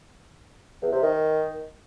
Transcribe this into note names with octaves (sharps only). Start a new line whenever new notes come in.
E2
C3
D#3